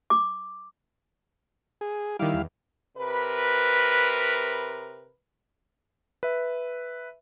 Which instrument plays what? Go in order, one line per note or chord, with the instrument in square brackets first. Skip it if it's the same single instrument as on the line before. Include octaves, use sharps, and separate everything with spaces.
[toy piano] D6
[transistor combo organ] G#4
[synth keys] D#3 D6 [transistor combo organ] G3 E4 F5
[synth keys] E2
[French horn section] C3 A#4 B4
[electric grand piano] B4 E5